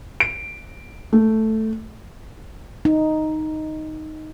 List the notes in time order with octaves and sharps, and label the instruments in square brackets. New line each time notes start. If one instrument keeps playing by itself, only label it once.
[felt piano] D7
A3
[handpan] D#4